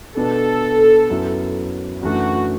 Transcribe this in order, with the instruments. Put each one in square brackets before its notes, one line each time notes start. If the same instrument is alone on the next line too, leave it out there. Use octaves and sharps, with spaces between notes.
[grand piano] B2 B3 D4 [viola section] A4
[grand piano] F#2 F#3 B3 E4 B4
[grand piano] F#2 E3 A3 D4 [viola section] F#4